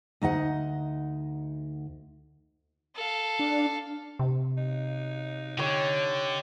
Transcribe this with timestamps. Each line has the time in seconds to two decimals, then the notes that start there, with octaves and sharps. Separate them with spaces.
0.22 D2 D#4 D#5 F#5
2.95 A4 F5
3.39 D4
4.19 C3
4.57 D#4
5.59 D3 G4 C#5